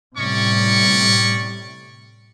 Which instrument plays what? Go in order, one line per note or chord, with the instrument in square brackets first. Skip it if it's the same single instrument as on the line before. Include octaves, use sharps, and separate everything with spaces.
[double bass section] A2 C3 G3 [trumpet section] C#4 D5 C#6